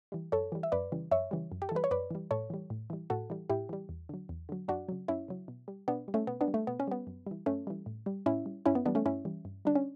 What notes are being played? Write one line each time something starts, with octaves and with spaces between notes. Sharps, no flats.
E3 G3
F#2 A4 C#5
E3 G3
E5
F#2 B4 D5
C#3 E3 G3
F#2 C#5 E5
C#3 E3 G3
F#2
G4
A4
E3 G3 B4
C#5
F#2 B4 D5
E3 G3
A2 A4 C#5
E3 G3
A2
E3 G3
A2 F#4 A4
E3 G3
A2 E4 G4
E3 G3
E2
D3 F#3
E2
D3 F#3
F#2 D4 F#4
C#3 F#3
F#2 C#4 E4
C#3 F#3
B2
G3
B2 B3 D4
G3
A3 C#4
B2 B3
B3 D4
G3
A3
B2 B3
C#4
G3 B3
F#2
E3 G3
F#2 A3 C#4
E3 G3
A2
G3
A2 C#4 E4
G3
G2 C#4 E4
B3
E3 G3 B3 D4
A3 C#4
G2 C#4 E4
E3 G3
G2
D3 G3 D4
C#4